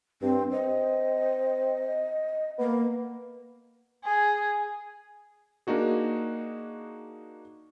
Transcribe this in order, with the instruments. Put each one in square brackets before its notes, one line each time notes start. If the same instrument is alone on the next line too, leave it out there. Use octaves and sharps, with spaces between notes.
[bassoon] G2 [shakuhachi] C4
[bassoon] C4 [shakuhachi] D#5
[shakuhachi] A#3 [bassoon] B3
[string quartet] G#4
[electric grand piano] A#3 D4 D#4 F#4 G#4